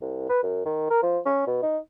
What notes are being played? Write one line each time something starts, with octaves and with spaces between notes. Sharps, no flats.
C2
B4
F#2
D#3
A#4
F3
C#4
B2
D#4